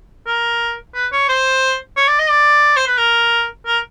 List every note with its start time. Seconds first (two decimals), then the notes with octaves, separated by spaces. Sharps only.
0.27 A#4
0.95 B4
1.12 C#5
1.29 C5
1.97 C#5
2.08 D5
2.19 D#5
2.30 D5
2.77 C5
2.87 B4
2.98 A#4
3.67 A#4